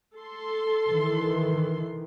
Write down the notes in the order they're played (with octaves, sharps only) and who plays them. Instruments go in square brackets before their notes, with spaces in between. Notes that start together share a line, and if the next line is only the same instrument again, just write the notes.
[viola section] A4 C6
[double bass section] D#3 E3